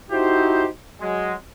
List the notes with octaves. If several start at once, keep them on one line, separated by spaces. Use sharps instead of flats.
D#4 E4 F#4 G4 C5
F#3 G#3